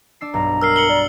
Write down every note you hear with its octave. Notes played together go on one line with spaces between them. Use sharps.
D4 E6 C7
B1 G2 A#5
A#4 E6 F6 C7
C#7 F#7 G7
D5